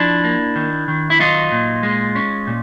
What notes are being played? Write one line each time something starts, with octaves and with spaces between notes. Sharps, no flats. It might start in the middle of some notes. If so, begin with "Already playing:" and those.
Already playing: F3 D4 E4
A#3
D#3
D#3
E4
F#3 D#4 F4
A#2
G#3
C#4
A#2